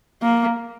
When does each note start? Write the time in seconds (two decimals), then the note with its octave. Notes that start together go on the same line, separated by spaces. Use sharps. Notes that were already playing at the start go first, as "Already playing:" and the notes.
0.22 A#3